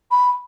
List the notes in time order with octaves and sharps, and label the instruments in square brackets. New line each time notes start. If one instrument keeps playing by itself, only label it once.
[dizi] B5